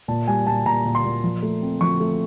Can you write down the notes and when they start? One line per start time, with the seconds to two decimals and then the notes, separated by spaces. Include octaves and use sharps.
0.08 A#2 A5
0.28 G3 G#5
0.47 A#2 A5
0.66 A#2 A#5
0.85 A#2
0.95 C6
1.04 A#2
1.24 F3
1.42 A3
1.62 C4
1.81 F3 C#6
2.00 A3